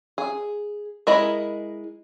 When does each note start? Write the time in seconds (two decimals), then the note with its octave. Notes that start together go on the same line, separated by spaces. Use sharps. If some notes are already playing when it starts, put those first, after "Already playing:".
0.18 G#4
1.07 G#3 E4 A#4 D#5 B5